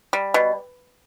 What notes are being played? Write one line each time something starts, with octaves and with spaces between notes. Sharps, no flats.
G3
B2